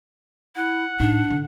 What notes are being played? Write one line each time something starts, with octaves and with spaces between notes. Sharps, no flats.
E4 F#5
A2 D4 D#4
D3